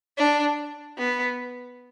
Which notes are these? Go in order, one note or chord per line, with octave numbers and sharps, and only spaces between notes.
D4
B3